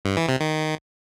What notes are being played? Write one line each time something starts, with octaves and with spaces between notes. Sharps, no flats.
G2
E3
C3
D#3